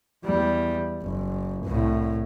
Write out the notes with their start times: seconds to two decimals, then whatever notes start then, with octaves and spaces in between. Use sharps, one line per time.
0.25 E2 G3
1.03 F#1
1.66 C2 A2